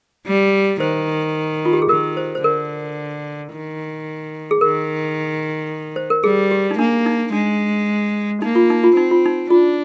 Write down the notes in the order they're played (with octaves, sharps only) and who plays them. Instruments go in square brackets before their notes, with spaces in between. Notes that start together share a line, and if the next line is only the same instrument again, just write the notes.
[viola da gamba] G3
[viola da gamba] D#3 [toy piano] C5
[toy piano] F4
G4
G#4
[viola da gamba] D#3 [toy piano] A#4
[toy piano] C5
C5
[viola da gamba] D3 [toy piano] A#4
[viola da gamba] D#3
[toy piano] G#4
[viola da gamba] D#3 [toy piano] A#4
[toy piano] C5
A#4
[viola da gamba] G3 [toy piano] G#4
[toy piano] G4
D#4
[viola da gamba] A#3 [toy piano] D4
[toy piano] D#4
[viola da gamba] G#3 [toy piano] D4
[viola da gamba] A#3 [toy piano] D#4
[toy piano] F4
D#4
F4
[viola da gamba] C4 [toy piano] D#4
[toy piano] F4
D#4
[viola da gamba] D4 [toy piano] F4